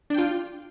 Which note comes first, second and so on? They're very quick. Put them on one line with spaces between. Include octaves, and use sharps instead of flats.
D4 G5 F4